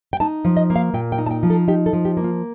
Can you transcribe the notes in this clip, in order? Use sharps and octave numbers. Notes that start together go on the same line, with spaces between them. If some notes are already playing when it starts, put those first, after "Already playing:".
G5
D#4 A5
F3
D#5
A#3
F5
A#2 G5
G5
D#4
A5
G5
F3
A4
D#4 G4
A4
F3
G4
A#3
F4